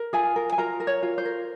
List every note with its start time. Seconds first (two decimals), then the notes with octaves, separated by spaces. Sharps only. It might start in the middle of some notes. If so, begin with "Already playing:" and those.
Already playing: A#4
0.13 F4 G#4 G#5
0.36 A#4
0.52 G#5
0.58 F4 A#4 A#5
0.80 A#4
0.87 C#5
1.03 F4
1.18 C5
1.25 A#4